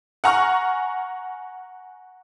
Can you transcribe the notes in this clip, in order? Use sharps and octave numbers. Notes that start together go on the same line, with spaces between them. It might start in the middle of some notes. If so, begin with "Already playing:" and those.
F#5 G#5 A#5 C#6 F6